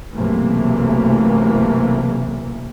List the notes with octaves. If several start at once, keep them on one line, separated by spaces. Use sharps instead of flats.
B1 F#2 C3 E3 A3 A#3